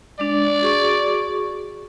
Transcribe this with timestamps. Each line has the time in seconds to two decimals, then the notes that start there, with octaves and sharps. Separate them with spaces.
0.19 G#3 D4 D5
0.62 F#4 G#4 C#6